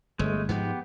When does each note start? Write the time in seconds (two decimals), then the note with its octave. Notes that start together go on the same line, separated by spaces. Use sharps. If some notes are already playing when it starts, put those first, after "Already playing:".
0.19 G1 G#3 A3
0.49 G#2 F3 G#3 B3 G4